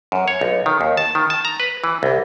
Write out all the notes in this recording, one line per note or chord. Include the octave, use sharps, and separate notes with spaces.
F#2
C#5
B1
D#3
D#2
A5
D#3
A5
A#5
B4
E3
C2